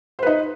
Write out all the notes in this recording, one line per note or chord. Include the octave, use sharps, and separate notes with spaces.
D#4 B4 C5